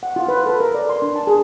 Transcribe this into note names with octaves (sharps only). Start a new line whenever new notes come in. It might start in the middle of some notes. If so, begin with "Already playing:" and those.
F#5
F4
B4
A4
A#4
D5
C6
D4
A5
G#4